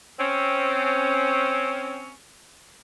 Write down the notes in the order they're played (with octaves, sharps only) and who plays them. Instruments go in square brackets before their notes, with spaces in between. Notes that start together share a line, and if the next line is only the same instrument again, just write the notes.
[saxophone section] C4 C#4